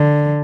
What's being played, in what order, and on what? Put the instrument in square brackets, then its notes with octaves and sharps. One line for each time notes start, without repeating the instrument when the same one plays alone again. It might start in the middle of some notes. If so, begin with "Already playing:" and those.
Already playing: [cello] D3